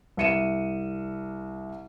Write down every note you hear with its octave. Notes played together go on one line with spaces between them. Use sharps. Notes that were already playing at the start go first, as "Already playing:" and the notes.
C2 E5 C#7 D#7 E7